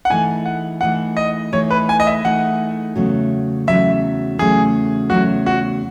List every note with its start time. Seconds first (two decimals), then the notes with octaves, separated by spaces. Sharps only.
0.05 F#5
0.10 E3 A3 D#4 G#4 G#5
0.46 F#5
0.81 E3 A3 D#4 G#4 F#5
1.17 D#5
1.52 E3 A3 D#4 G#4 C#5
1.70 B4
1.89 G#5
2.00 D#5
2.07 E5
2.24 E3 A3 D#4 G#4 F#5
2.95 E2 C#3 F#3 A3
3.67 E2 C#3 F#3 A3 E5
4.39 E2 C#3 F#3 A3 G#4
5.10 E2 C#3 F#3 A3 F#4
5.46 F#4